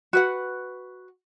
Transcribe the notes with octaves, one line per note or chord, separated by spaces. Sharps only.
F#4 B4 F#5